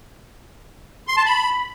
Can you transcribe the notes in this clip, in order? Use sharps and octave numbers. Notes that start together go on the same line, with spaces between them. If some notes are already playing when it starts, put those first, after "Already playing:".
C6
A5
B5